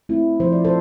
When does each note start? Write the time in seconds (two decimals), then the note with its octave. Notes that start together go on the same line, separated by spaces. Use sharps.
0.09 A3 C4 E4
0.40 F3 C5
0.52 D5
0.65 A4 C5